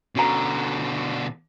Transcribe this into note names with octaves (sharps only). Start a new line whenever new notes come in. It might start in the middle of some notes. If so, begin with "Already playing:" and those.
B2 D3 C#4 F#4 A#5